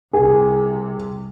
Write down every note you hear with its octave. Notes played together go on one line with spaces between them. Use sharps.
C2 C3 G#4